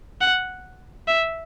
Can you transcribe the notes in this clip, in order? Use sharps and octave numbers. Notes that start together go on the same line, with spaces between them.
F#5
E5